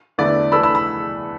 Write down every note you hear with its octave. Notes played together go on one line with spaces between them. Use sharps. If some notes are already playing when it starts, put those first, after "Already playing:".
E2 D3 A3 E4 B4 D5
E3 A3 D4 A4 B5 E6
B5 E6
B5 E6